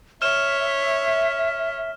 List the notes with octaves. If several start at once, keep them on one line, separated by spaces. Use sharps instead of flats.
C#5 E5 F6 E7